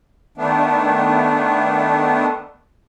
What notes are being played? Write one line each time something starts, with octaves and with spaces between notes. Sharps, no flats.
D#3 A3 B3 D4